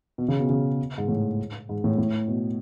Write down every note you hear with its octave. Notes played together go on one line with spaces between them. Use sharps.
B2
C#3
B2
C#3
G#2
A2
G#2
A2
A2
B2